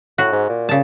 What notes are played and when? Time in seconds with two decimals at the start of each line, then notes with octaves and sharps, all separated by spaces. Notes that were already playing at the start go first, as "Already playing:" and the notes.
0.18 A2 F#4
0.32 G#2
0.49 A#2
0.69 C#3 A5